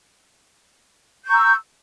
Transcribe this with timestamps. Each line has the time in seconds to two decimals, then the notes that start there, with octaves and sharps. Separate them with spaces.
1.25 G6
1.27 C#6
1.30 A#5
1.33 E6